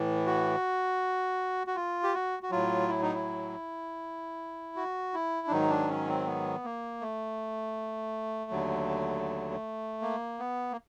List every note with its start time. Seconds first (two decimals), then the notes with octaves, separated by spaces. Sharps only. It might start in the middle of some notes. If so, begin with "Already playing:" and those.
Already playing: A2 E3
0.26 F#4
1.67 F#4
1.76 F4
2.03 G4
2.14 F#4
2.43 F#4
2.51 A2 F#3 F4
2.88 E4
3.02 D#4
3.14 E4
4.76 F#4
5.14 E4
5.47 D4
5.51 G#2 D#3 F#3 D#4
5.70 D4
5.89 C#4
6.08 C4
6.26 B3
6.64 A#3
7.01 A3
8.51 D#2 D3 F#3
10.02 A#3
10.39 B3
10.72 A#3